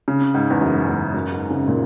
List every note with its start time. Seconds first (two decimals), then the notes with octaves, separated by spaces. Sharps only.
0.08 C#3
0.34 G#2
0.50 E2
0.61 F#2
0.88 E2
1.14 F#2
1.32 G#2
1.50 C#3
1.68 A#2